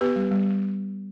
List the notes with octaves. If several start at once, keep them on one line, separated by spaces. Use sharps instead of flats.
B3 G4 B4
G3
G3